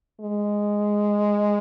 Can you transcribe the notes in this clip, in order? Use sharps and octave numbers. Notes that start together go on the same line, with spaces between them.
G#3